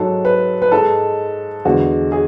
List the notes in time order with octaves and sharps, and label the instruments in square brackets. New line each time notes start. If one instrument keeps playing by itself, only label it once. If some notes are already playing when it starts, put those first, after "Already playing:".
Already playing: [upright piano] G#2 F#3 A4
B4
B4
G#2 G#3 A4
E2 D3 G#3 F#4
G#4